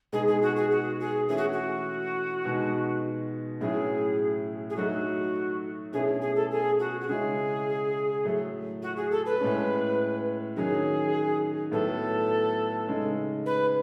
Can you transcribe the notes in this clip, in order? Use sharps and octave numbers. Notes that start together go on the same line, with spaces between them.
B2 G#3 D#4 G#4
G#4
F#4
G#4
F#4
G#4
E3 A3 C#4 E4 G#4
F#4
F#4
B2 G#3 D#4
A2 F#3 C#4 E4 G#4
G#4
F#3 A3 D#4 F#4
B2 A3 C#4 E4 G#4
G#4
A4
G#4
F#4
F#4
C#3 G#3 C#4 E4 G#4
A2 F#3 A3
F#4
G#4
A4
B4
A2 G#3 C#4
D#3 F#3 C#4 G#4
A2 F#3 B3 A4
C#3 G#3 D#4
B4